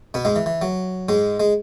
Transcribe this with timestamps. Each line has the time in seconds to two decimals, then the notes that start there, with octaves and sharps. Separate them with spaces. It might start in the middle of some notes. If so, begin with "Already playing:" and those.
0.14 B2 B3
0.25 G#2 G#3
0.36 E3
0.46 E3
0.62 F#3
1.09 G#2 G#3
1.40 G#3